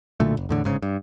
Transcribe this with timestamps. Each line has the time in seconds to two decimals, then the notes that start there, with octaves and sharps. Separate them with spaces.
0.20 B1 A#2 D3 A3
0.37 F#1
0.49 E2 A2 D3
0.64 G1 G#2 C#3
0.82 G2